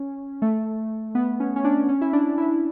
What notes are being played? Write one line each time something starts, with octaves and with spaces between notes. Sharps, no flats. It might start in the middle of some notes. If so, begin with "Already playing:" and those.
Already playing: C#4
A3
B3
C#4
C#4
D4
C#4
E4
D4
E4